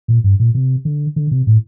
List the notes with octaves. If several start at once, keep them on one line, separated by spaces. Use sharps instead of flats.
A#2
G2
A#2
C3
D3
D3
C3
A2